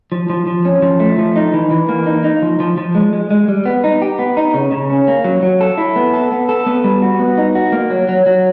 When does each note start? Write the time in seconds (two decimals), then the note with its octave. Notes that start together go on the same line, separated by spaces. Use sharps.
0.12 F3
0.30 F3
0.47 F3
0.65 C#4
0.82 F3
1.00 A3
1.18 F3
1.36 D#4
1.54 E3
1.71 E3
1.89 A#3
2.06 D#4
2.24 D#4
2.42 F3
2.60 F3
2.77 F3
2.95 G#3
3.13 G#3
3.31 G#3
3.48 G3
3.66 B3
3.84 D#4
4.02 G4
4.19 B3
4.37 D#4
4.54 C#3
4.72 C#3
4.90 C#4
5.08 A#3
5.24 F#3
5.42 F#3
5.61 A4
5.78 E4
5.96 B3
6.14 A4
6.32 B3
6.49 A4
6.66 B3
6.84 G3
7.02 F#4
7.20 B3
7.38 D#4
7.55 F#4
7.72 A#3
7.90 F#3
8.09 F#3
8.26 F#3